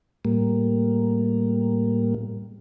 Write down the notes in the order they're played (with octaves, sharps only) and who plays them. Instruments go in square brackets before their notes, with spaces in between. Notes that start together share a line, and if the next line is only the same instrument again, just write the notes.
[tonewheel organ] A2 G3 A#3